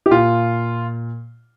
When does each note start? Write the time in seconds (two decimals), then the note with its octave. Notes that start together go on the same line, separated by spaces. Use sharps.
0.06 G4
0.11 A#2 F4